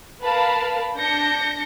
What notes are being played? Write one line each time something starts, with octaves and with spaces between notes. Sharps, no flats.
A#4 B4 F5 A5 B5
D4 G6 A#6 C#7